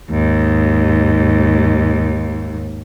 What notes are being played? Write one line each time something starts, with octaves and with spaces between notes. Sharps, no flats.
D#2 G#2